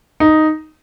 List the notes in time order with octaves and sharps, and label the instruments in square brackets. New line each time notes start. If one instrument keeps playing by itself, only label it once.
[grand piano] D#4